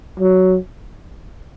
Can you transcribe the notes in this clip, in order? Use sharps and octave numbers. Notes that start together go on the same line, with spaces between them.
F#3